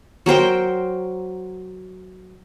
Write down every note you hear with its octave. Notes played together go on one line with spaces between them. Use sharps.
F#3 A#4 C5 G5